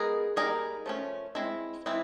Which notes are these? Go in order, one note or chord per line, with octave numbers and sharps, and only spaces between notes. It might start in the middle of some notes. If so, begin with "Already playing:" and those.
Already playing: G#3 B3 D#4 G#4 A#4
G3 A#3 D#4 G#4 A#4
F3 A3 C#4
G#3 C4 E4
E3 G#3 C4 E4